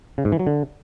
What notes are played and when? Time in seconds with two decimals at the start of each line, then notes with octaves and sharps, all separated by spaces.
0.18 C#3
0.25 G#2
0.32 E3
0.39 F#3
0.47 D3